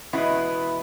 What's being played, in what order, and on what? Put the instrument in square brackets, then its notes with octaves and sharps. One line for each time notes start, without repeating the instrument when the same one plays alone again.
[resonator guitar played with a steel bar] E2 B2 G#3 B3 E4